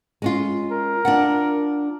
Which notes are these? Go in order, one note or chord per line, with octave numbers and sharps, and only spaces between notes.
G#3 C#4 F4
A#4
D4 F4 F#5